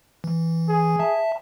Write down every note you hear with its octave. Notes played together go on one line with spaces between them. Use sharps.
E3
G#4
E5 A5